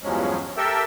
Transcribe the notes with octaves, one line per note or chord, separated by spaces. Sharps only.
E2 G2 F3 F#3 G#3 C#4
G4 A4 A#4 E5 G5 E6